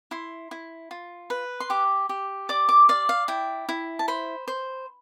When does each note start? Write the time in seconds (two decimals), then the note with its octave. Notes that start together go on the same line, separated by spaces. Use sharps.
0.11 E4 C6
0.51 E4
0.91 F4
1.30 B4
1.60 C6
1.70 G4 D6
2.09 G4
2.49 D5 D6
2.69 D6
2.89 D5 F5
3.09 F5
3.28 E4 G5
3.69 E4
3.99 A5
4.08 C5 B5
4.48 C5